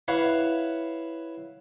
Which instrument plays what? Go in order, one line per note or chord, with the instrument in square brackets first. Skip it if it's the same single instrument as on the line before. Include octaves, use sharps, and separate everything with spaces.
[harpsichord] E4 B4 C#5 F5 F#5